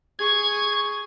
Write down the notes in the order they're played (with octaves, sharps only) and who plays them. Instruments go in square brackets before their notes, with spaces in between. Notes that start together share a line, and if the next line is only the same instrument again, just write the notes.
[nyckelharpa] G#4 C#6 [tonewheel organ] G#6